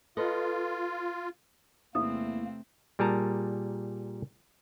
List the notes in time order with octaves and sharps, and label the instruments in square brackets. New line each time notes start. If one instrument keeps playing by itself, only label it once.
[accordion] F4 [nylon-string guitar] A4 B4 D#5
[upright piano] E2 E4 [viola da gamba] C3 A3 C4 [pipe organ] A#3 [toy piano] D#6
[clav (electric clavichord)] A#2 G3 G#4 A#4 A5 A#5